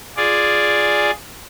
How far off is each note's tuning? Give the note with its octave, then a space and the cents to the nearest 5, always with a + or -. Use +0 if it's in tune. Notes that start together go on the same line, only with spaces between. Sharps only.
F4 +0 G#4 +0 D5 +0